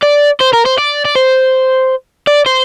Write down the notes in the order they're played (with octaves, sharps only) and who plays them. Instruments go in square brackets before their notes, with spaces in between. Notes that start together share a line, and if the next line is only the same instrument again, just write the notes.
[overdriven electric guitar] D5
C5
A#4
C5
D5
D5
C5
D5
C5